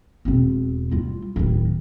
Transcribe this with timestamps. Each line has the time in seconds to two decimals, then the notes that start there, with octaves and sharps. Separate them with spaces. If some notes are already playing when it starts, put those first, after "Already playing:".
0.25 E1 C4
0.91 G3 F4
1.36 D1 D#3